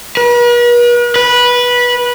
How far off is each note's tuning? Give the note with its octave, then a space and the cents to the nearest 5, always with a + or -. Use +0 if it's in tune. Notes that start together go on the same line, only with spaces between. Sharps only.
B4 -45
B4 -15